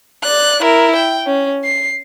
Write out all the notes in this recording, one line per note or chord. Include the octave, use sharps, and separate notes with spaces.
D5 F#6
E4 A#4
G5
C#4
C7